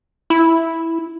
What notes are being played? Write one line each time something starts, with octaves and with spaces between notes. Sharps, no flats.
E4